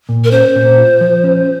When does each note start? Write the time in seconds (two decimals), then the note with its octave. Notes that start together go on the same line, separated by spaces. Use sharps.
0.09 A#2
0.24 A#4
0.31 C#4 C5
0.56 A#2
0.78 F4
1.01 F3
1.24 C#4